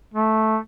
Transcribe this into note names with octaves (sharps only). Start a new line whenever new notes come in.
A3